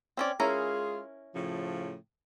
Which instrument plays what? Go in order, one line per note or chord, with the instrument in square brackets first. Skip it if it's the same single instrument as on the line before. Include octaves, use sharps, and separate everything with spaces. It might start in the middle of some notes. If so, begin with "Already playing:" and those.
[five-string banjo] C4 C#4 D5
[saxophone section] G#3 F4 G#4 [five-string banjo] C#4 E4 A#4
[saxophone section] A2 C#3 F3